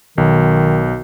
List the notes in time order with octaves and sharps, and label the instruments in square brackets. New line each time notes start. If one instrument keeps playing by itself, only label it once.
[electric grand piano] B1 [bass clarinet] D#3